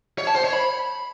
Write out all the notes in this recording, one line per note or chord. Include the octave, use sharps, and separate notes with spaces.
C#5
A5
C5
C#5
B5